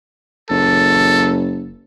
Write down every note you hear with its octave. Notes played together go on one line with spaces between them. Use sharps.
F#1 A4